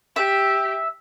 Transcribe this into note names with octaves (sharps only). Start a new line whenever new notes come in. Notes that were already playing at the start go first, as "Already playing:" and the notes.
G4 E5